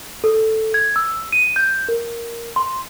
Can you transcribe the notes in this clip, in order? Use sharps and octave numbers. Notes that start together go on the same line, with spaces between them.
A4
G#6
E6
D#7
G6
A#4
C6